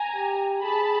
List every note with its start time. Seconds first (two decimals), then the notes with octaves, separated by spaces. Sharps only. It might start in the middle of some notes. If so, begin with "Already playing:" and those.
Already playing: G#5 A#5
0.16 G4
0.63 G#4 A5 B5